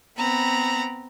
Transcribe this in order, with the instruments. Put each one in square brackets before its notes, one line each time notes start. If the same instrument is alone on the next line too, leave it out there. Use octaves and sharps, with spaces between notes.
[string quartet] B3 C4 A#5 B5